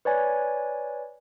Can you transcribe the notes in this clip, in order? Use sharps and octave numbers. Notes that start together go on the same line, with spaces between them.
B4 C#5 D5 G#5